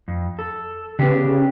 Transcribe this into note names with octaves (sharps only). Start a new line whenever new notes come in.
F2
A4
C#3 B3 D4 G4
C#3